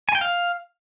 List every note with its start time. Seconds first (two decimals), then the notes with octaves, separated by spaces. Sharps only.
0.09 G#5
0.15 G5
0.21 F5